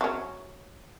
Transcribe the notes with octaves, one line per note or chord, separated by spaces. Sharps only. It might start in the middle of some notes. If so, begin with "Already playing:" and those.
F#3 C#4